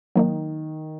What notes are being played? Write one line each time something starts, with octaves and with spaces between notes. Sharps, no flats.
D#3 F#3 A#3 D#4